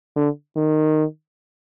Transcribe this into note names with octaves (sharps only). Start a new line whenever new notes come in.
D3
D#3